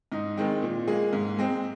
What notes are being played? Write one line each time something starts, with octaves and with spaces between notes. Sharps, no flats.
G#2 D#4
D#3 G#3 C4
A#2
G#3 A#3 G#4
G#2
G#3 C4